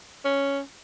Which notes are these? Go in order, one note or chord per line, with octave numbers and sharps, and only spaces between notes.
C#4